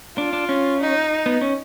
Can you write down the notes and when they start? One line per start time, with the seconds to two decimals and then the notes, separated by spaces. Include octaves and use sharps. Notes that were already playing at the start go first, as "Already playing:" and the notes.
0.18 D4 F4
0.33 D4
0.49 C#4
0.80 D#4
1.26 B3
1.41 C#4